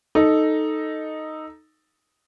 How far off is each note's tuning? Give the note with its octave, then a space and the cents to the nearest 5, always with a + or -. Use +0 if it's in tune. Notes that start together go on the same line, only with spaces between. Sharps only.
D#4 +0 A4 +0